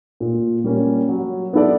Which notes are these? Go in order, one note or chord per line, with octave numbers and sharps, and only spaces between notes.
A#2
G3 A#3 C#4
F#3
B3 E4 A4 D5